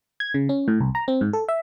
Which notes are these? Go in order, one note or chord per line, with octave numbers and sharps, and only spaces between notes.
G#6
C#3
C#4
A2
C2
A#5
C4
G#2
A4
E5